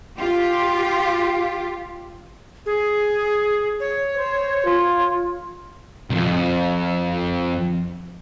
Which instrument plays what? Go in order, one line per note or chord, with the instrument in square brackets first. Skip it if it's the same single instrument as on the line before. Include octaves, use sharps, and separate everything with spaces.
[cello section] F4 G4
[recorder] G#4
C#5
[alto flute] C5
F4
[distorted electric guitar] C2 F2